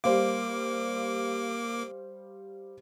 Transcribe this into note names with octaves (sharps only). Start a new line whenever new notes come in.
G3 A#3 C5 F5 D6